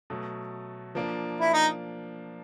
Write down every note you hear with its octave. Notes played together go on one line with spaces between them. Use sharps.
B2 F#3 A3
F3 A#3 D4
E4
D#4